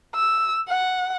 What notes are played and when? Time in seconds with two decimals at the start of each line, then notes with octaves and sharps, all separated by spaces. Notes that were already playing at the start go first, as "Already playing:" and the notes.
0.15 E6
0.68 F#5